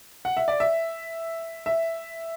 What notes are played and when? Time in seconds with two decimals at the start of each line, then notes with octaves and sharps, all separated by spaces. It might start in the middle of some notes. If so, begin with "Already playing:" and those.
0.25 F#5
0.37 E5
0.48 D5
0.60 E5
1.66 E5